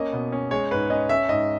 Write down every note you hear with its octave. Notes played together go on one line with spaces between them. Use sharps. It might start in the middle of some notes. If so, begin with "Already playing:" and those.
Already playing: A#3 C#4 D#5
B2
C#4
G#3 C#5
G#2 B4
C#4 D#5
C#4 E5
G#2 D#5